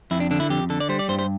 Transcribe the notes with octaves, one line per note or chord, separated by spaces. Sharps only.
F2 E4
D4
D3 D4
E4
F2 G4
D3 A4
D5
G3 C5
D5
G2 C5
C5